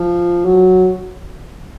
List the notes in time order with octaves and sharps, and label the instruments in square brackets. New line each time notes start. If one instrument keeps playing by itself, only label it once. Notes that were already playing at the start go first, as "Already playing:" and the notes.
Already playing: [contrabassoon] F3
F#3